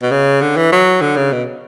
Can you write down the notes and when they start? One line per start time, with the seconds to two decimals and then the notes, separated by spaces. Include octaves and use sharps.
0.03 B2
0.11 C#3
0.42 D3
0.57 E3
0.72 F#3
1.01 D3
1.17 C#3
1.32 B2